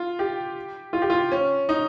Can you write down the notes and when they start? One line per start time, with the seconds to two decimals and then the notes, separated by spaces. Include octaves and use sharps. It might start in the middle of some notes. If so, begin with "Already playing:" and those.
Already playing: F4
0.19 G4
0.93 F4
1.02 G4
1.10 F4
1.32 C#4
1.69 D#4